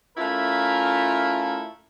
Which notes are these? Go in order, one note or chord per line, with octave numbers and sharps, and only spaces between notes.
A3 C#4 E4 F4 A#4